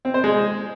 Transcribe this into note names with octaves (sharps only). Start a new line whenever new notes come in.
C4
C5
G#3